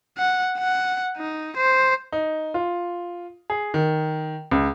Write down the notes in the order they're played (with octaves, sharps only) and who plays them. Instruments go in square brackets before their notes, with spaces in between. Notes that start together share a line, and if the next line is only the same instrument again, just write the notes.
[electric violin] F#5
F#5
D#4
C5
[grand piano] D#4
F4
G#4
D#3
C#2